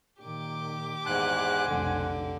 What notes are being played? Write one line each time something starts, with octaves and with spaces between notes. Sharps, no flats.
A#2 D#3 G4 D6
E2 G#2 C5 F#5 G#5 F#6
F1 B1 D3